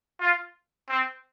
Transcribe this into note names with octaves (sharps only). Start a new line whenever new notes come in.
F4
C4